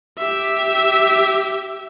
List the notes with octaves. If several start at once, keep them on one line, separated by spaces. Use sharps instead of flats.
G4 E5